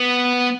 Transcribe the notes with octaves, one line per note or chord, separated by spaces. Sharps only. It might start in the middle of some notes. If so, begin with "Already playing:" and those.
Already playing: B3